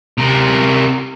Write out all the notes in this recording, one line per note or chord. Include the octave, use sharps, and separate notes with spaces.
C3 A#4